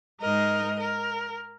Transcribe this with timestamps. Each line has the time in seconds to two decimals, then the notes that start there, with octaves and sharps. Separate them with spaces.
0.21 G#2 G#3 D#4 A#4 D#5
0.80 A#4